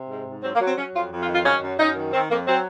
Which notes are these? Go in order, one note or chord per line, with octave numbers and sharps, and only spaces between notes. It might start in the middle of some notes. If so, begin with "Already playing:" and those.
Already playing: C3
G#2
G#2
F#3 C4
A#3
F#3
C4
F#3 C#4
F2 F4
F2
F4
D#3
F4
F#3 C#4
F#2
F#2 D#4
D#3
D#3 C4
F2 A#3
F#3 C4